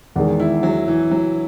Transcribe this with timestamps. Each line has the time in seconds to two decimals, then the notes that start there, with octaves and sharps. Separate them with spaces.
0.16 E2 D#3 G#3
0.40 E4
0.63 F#3
0.88 E3
1.11 F#3